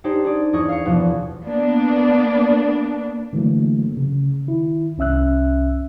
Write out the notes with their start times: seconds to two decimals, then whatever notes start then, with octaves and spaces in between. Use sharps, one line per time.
0.04 D4 D#4 G4 G#4 C5
0.24 G#4 D5
0.53 E2 G#4 D#5 C#6 G#6
0.69 F5 C#7
0.85 E2 B2 F3 B3
1.45 A#3 B3 D4
3.33 D3 E3 F#3 A3 A#3
3.97 C#3
4.47 D#3 E4
4.98 C2 C#4 E5 E6 F#6